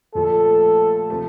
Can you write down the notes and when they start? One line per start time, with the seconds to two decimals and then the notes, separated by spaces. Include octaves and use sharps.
0.14 A#2 F3 A3 A4
1.10 C3 F3 A3